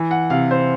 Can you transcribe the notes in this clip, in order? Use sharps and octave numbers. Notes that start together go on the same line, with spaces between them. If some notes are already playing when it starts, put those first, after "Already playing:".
Already playing: E3
F#5
C3 F5
C5